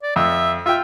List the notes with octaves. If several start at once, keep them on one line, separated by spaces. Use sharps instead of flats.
D5
F2 E5
F4 E5 G5